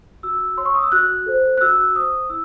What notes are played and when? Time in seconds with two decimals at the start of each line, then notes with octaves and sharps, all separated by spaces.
0.23 F#4 E6
0.58 C#5 C6
0.66 C#6
0.75 D#6
0.83 E6
0.92 F#4 F#6
1.26 A4 C5
1.57 F#6
1.61 F#4 E6
1.95 C5 D#6
2.30 E4 E6